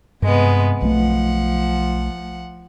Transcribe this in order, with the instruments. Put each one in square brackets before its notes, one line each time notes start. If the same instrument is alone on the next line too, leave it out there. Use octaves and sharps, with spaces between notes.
[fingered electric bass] G2 [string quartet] C3 G#3 B3
[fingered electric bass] B1 A3 [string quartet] F3 F#5